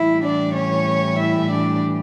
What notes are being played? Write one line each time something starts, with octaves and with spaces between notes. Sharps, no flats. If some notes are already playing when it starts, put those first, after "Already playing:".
Already playing: A2 E3 G3 E4
D4 D5
C#4 C#5
E4 E5
D4 D5